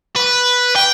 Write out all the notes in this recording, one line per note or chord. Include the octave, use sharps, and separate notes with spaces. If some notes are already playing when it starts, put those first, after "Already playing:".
B4
G5